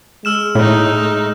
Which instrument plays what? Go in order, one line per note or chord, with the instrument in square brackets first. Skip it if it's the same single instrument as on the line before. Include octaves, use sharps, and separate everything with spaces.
[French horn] G#3 [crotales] E6 F6 E7
[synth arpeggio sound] A2 [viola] A3 D#4